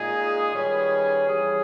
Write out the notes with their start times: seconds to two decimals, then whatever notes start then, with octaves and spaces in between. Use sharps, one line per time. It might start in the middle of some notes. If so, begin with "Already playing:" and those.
Already playing: A#2 G#3 D#4 G#4
0.52 D#3 G3 C#4 G#4 B4
1.27 E3 G3 C#4 G#4